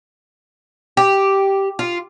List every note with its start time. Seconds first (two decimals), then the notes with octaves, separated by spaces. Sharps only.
0.97 G4
1.79 F4